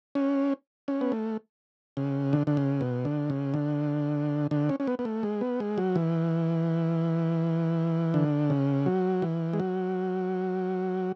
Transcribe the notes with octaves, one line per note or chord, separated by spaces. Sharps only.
C#4
C#4
B3
A3
C#3
D3
D3
C#3
B2
D3
C#3
D3
D3
C#4
C#4
B3
B3
A3
G#3
B3
G#3
F#3
E3
D3
C#3
F#3
E3
G#3
F#3